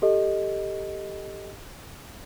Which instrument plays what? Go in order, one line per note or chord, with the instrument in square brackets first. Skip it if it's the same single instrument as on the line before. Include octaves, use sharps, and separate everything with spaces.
[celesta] G4 A4 D#5